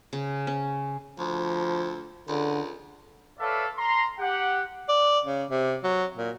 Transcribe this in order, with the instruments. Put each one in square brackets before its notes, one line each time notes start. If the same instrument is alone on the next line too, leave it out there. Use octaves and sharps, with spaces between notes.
[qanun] C#3
C#4
[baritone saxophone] D2 [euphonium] F3
[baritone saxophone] C#2 [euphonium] D3
[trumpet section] A4 B4 C#5 D5 E5 F5
A#5 C6
G4 F#5
[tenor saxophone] D5
C#3
C3
F#3
A#2